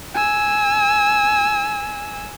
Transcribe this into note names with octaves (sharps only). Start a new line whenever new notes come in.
G#5 E6